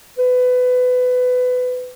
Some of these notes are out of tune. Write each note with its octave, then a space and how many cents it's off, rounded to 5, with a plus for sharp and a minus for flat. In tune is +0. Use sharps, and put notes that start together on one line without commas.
B4 +20